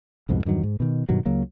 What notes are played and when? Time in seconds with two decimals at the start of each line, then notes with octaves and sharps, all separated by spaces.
0.29 C2 F2 G#2 B2
0.45 E2 G2 D#3 F#3
0.63 G#2
0.80 B2 D#3
1.09 G2 B2 D#3 F#3
1.26 C#2 C#3 F#3 A#3